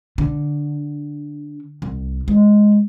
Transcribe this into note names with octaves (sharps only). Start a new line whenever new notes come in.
D3
C2
G#3